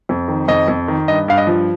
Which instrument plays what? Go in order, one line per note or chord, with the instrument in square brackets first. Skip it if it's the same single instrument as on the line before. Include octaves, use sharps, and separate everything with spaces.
[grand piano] F2
D#3
F2 D#5
F2
D#3
G2 D#5
G2 F5
D#5
F3